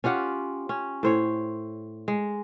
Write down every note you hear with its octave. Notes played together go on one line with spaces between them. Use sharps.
C#4 F4 G4 F#5
C#4
A2 C5 C#5
G#3